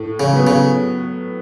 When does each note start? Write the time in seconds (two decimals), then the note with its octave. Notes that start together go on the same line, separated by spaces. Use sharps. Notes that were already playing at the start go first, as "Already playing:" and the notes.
Already playing: A2
0.20 C#3
0.32 F#3 B3
0.47 C#3